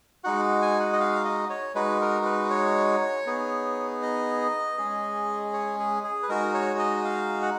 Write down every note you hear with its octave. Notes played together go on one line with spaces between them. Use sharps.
G#3 D#4 F#4 F#5
G#5
F#5
D#5
F5
D#5
C#5
G#3 D#4 F#4 B4
A#4
B4
C#5
B3 D#4 G#4
D#5
G#3 C#4 G#4
C#5
G#4
G#4
B4
G#3 D#4 F#4 A#4
C#5
D#5
F5
F#5